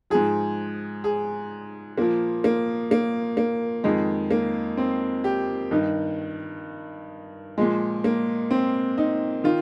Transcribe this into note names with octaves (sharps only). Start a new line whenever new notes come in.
G#2 F3 G#4
G#4
A#2 F3 A#3
A#3
A#3
A#3
F2 D#3 G#3
A#3
C4
G4
G2 D#3 D#4
A#2 F3 G#3
A#3
C4
D#4
D#3 F4